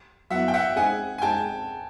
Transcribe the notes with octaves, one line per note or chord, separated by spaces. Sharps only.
F#3 B3 E4 E5 F#5
G5
E5 F#5
G#3 C4 D#4 G#4 F#5 G#5
G#5
G#3 C4 D#4 G#4 G5 A5